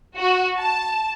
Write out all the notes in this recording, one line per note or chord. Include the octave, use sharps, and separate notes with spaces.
F#4
A5